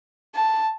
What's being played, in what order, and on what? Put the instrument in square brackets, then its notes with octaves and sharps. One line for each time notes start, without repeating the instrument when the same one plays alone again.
[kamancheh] A5